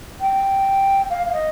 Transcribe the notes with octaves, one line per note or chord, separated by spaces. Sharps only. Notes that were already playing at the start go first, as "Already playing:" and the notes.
G5
F5
F5
D#5